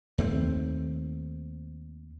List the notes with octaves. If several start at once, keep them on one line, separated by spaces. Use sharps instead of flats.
D#2 A3 C4